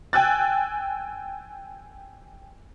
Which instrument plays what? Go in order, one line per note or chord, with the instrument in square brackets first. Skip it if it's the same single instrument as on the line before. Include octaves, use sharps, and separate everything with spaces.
[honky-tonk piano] G5 G#5 E6 F#6 A6